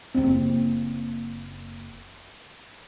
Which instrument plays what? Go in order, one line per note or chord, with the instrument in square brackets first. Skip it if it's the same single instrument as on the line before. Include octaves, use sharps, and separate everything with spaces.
[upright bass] F#1 A#3 [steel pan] C4